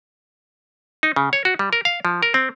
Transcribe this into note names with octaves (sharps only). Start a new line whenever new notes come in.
D#4
C#3
C#5
F#4
G3
A#4
F5
F3
A#4
C4